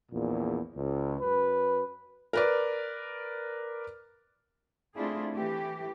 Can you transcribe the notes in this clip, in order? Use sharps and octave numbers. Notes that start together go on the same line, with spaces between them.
A#1 E2 A#2
C#2
F#2 B4
A#4 B4 D5
A3 C4 D4 E4 F4 G#4
E3 A3 G4